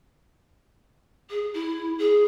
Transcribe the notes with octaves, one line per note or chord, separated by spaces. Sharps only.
G#4
E4
G#4